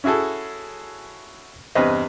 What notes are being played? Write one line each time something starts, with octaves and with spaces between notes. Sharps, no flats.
C#4 E4 F#4 G#4 A4
E2 G2 C3 B4 C5 D#5